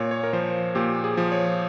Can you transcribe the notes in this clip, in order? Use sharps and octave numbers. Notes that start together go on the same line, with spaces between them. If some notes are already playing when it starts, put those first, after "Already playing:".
Already playing: A#2 C#5
C#5
A#4
F3 C5
A#2 G4
G#4
F3
C#5